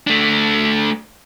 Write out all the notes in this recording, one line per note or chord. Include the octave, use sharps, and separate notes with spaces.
A3 D4